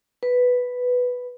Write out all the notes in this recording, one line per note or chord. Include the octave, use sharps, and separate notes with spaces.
B4